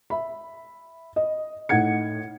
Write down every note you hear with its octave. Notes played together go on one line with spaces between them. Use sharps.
E5 B5
D#5
A2 D#4 F#5 G#6 C#7